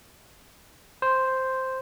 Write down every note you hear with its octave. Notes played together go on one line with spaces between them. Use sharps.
C5